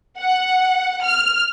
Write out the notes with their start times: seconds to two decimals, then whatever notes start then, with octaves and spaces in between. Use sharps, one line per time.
0.18 F#5
1.04 F6